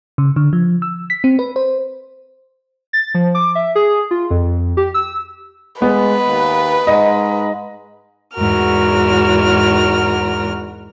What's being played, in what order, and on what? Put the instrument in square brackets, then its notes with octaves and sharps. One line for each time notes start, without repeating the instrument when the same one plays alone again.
[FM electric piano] C#3
D3
F3
E6
B6
C4
B4
C5
[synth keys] A6
F3
D6
E5
G#4
F4
F2
G4
E6
[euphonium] G#3 [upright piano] B3 [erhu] B4
[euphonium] D#2
[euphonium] G#2 [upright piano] D#5
[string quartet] E2 G#2 F#4 A#4 F6